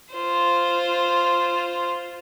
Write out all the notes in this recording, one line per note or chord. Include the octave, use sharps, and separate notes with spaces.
F4 C5